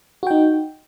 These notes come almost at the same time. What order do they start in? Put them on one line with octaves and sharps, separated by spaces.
F#4 G5 D#4